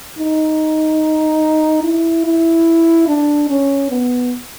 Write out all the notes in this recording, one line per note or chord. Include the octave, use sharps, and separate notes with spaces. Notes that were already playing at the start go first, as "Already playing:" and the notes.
D#4
E4
E4
D4
C#4
B3